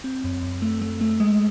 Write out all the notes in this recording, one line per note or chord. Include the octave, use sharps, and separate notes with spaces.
C4
F#2
F#2
A3
A3
A3
G#3